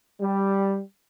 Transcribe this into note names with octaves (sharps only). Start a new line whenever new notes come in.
G3